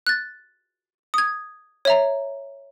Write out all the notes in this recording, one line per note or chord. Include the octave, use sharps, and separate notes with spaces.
F#6 A6
D#6 G#6
C#5 E5 A#5